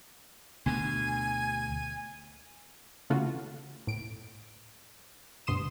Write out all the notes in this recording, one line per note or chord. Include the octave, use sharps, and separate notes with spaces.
D2 B2 D3 G#5
C#3 E3 A3 F4 F#4
A2 D7
D2 G2 B2 C6 D#6 E7